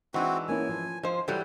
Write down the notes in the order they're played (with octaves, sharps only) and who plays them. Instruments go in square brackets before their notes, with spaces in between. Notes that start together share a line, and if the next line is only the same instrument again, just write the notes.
[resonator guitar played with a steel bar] E3 G#3 D4 [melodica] C4 F#4 [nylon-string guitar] D#4
[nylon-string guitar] A#3 C#4 E4 [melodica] G#5
[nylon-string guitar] F3
[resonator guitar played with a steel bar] F3 C5 [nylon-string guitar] D#5
[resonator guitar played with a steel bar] E3 F#3 G3 [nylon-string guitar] F4 A4 [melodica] G5